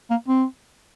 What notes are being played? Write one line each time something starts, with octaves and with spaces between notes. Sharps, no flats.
A#3
C4